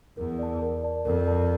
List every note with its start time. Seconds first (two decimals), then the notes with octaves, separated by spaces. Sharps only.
0.17 E2 A#4
0.39 D5 A5
0.62 A#4
0.83 D5 A5
1.05 F2 A#4
1.27 D5 A5